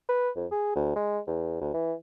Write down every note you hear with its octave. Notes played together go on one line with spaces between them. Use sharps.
B4
F2
G#4
D2
G#3
E2
D2
E3